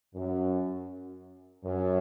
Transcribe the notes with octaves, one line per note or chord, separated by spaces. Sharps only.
F#2
F#2